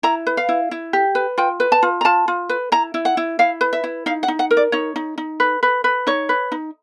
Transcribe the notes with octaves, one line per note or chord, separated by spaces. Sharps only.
E4 A#5
B4
F5
E4
E4
G4
B4
F4 G5
B4
A5
F4
A#5
F4 A5
F4
B4
E4 A#5
E4
F#5
E4
E4 F5
B4
E5
E4
D#4 F5
F#5
D#4
F#5
A#4
D5
D#4 C#5
D#4
D#4
B4
B4
B4
D#4 C#5
B4
D#4